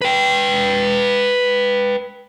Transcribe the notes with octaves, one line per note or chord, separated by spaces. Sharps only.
B4 G5